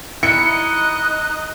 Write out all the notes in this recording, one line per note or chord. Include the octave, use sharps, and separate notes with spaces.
D#4 E4 D#5 F#6 C#7